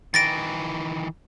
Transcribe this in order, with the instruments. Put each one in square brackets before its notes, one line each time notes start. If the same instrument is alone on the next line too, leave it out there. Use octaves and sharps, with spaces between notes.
[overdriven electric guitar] D#3 E3 [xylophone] A6 A#6 D7